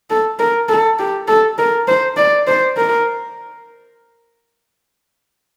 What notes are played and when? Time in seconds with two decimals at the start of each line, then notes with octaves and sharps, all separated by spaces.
0.10 A4
0.39 A#4
0.69 A4
0.99 G4
1.28 A4
1.58 A#4
1.88 C5
2.17 D5
2.47 C5
2.77 A#4